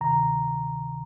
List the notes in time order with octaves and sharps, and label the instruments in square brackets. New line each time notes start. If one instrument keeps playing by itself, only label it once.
[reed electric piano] D2 C3 D#3 A#5